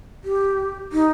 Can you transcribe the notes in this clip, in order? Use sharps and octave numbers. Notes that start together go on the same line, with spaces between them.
G4
D#4